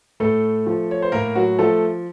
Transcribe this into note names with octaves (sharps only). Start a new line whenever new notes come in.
A2 A3 A4
F3
C#5
C5
A2 A#3 A#4
F#3 F#4
F3 A3 A4